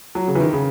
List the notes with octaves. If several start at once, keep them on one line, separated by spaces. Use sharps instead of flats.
F#3
C#3
E3
D#3
C#3